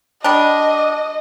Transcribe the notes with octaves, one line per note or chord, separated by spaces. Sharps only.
G3 D4 D#5